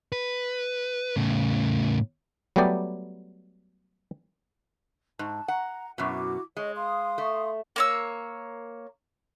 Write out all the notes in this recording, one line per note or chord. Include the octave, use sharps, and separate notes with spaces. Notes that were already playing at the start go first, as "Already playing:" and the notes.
B4
A2 C#3
F#3 G3 A3 B3 G4 D5
G#2 A5
F#5 A#5
F#2 B2 E4 F#4 D6
G#3 C#5 D#5
F5 C6 D#6
A3
A#3 C#5 E6